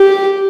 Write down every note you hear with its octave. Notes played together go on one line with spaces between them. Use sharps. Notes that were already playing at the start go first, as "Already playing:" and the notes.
Already playing: G4